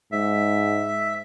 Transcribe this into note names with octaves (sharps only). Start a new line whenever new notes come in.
G#2 E5